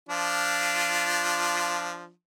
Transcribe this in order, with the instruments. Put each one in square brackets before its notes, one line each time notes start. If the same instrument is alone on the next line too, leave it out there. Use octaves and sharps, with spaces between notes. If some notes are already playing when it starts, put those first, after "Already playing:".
[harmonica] F3 D4 F4